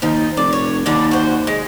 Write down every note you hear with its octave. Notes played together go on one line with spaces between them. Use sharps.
D#2 F3 D#4
F1 D5
C#5
D#2 D3 G3 D4
F#4 C5
G#3